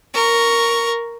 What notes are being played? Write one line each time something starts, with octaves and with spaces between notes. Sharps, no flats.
A#4 C#6